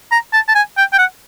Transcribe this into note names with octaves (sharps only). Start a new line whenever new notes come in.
A#5
A5
A5
G#5
G5
G5
F#5